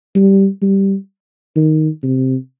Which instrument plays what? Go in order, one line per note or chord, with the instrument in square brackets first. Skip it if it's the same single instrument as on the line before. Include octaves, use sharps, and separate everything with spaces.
[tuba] G3
G3
D#3
C3